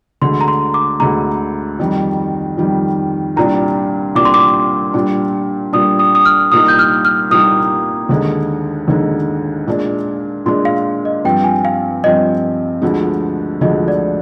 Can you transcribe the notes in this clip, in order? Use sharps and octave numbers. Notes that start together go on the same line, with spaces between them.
D2 D3 G#3 C6
A#5
C6
D6
D2 D3 G#3 A#5
F2 D#3 G3
F2 D#3 G3
C2 A#2 G3 D4 A#5
C2 A#2 G3 D4 D6
C6
D6
A#2 G3 D4
A#2 G3 D4 D#6
D#6
D#6
F6
C2 A#2 G3 A#3 D#4 D#6
G6
F6
F6
C2 A#2 G3 A#3 D#4 D#6
D#2 D3 G#3 D#4
D#2 D3 G#3 D#4
A#2 G#3 D4
A#2 G#3 D4 C6
F5
D#5
G2 F3 C4 G5
G#5
F5
G2 F3 C4 D#5
D2 D3 F3 G#3
D2 D3 F3 G#3 D#5
D5